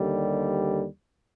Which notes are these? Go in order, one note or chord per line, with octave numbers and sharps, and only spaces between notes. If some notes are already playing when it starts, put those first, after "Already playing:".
Already playing: D#2 D3 G3